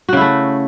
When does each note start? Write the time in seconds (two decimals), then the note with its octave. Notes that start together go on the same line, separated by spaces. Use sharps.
0.09 F#4
0.13 C#3
0.17 E4
0.21 A3